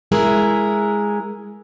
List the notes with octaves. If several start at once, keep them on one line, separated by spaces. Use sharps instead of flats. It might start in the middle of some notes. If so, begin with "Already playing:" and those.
G#3 E4 G#4 A#4